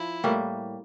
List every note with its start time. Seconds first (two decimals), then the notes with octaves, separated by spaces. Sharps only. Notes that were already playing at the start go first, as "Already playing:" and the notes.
Already playing: F3 E4
0.24 A2 G3 A#3